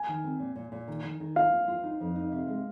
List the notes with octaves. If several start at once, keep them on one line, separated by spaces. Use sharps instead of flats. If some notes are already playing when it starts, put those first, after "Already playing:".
Already playing: G#5
D#3
C4
A#2
A#2
A#2
D#3
D#3
D#3
F4 F5
F4
F4
D#4
F2
D#4
C3
G#3